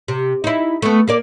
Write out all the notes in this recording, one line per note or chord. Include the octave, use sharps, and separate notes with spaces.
C3
D#4 E4
A3 B3
A#3 A#4 D5